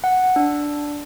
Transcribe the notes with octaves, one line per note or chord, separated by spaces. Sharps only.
F#5
D4